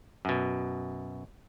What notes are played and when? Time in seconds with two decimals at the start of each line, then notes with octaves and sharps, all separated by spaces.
0.25 F#2 B2